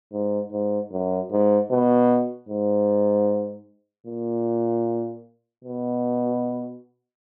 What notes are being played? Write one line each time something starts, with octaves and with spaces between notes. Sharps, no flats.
G#2
G#2
F#2
G#2
B2
G#2
A#2
B2